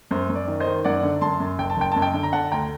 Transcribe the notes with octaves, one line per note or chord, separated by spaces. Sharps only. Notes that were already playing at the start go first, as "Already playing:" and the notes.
F#2 C5
F#2
D5
D#3
C5 D#5
D#3
F#2 D5 F#5
D3
F#2 A5 C6
F#2
F#1 G5
A5
F#1 G5
F#2 A5
D#5 G5
D3
A#5
D3 F#5 A5
D2 G5 A#5